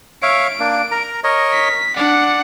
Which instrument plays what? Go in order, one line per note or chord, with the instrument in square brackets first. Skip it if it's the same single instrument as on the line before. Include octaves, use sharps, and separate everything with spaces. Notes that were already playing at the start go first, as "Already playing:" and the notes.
[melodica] C#5 E5 F5 [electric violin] D7
[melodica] A#3 D4
A#4 A#5
A#4 C#5 D#5
[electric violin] B6
[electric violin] D4 F#5 [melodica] D5